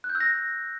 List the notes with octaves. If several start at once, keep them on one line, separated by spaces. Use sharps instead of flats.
F#6
G6
E6
A#6